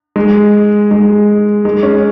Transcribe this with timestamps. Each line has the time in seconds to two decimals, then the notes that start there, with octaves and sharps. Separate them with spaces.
0.16 G#3
0.91 G#3
1.65 G#3
1.83 C#4